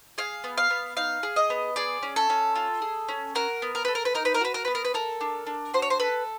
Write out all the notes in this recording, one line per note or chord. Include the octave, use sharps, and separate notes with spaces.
G#4 F5
B3
F5
B3
D#4 F5
G#4
D#5
B3
G#4 D5
C#4
A4
C#4
F4
G#4
C#4
F#4 A#4
B3
A#4
A4 B4
A#4
B4
D#4 A#4
B4
A#4
F#4 B4
A#4
B3 B4
A#4
B4
A4 A#4
D4
D4
F#4 C5
C#5
C5
A4 B4